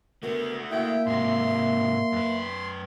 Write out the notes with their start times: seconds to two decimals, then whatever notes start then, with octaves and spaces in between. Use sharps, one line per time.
0.23 A3 B3 F#4 A#4
0.71 A#3 E4 E5 G5
1.06 G#2 C3 F#4 C6
2.12 F#2 B4